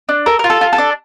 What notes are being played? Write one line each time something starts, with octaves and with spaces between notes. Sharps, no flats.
D4
A4 A#4
F4 A#4
A4
F4
A4
D4